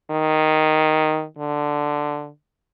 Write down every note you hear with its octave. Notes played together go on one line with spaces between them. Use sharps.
D#3
D3